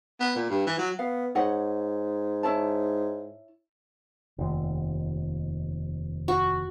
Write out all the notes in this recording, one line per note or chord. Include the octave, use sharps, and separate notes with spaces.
B3
A#2
G2
E3
F#3
B3 F5
G#2 C#5 D#5 F#5
E4 C#5 A5
F1 D#2
F#4